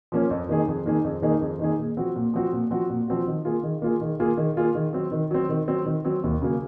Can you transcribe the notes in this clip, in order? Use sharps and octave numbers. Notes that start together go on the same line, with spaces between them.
F3 A#3 C#4
F2
D#3 A#3 D#4 G#4
F2
D#3 A#3 D#4 G#4
F2
D#3 A#3 D#4 G#4
F2
D#3 A#3 D#4 G#4
A#2
F3 C4 F#4
A#2
F3 C4 F#4
A#2
F3 C4 F#4
A#2
F3 C4 F#4
D#3
A#3 F4 G#4
D#3
A#3 F4 G#4
D#3
A#3 F4 G#4
D#3
A#3 F4 G#4
D#3
F#3 C4
D#3
F#3 C4
D#3
F#3 C4
D#3
F#3 C4
D#2
C#3 F#3 A#3